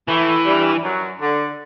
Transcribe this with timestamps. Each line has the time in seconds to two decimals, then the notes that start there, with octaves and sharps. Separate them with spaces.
0.08 A2 E3 A3
0.45 G2 G3
0.83 F#2 F#3
1.21 D3